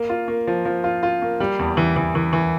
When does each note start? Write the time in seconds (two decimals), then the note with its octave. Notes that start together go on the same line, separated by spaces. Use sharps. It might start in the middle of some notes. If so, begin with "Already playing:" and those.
Already playing: A#3
0.09 F4
0.28 A#3
0.47 F3
0.65 F3
0.84 F4
1.03 F4
1.22 A#3
1.40 G3
1.59 E2
1.77 E3
1.96 E3
2.15 E3
2.33 E3